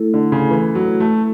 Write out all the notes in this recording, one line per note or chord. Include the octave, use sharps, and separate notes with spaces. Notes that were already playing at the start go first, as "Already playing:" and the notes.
Already playing: A3 E4 A4
D3
C#3
E3
F#3
A3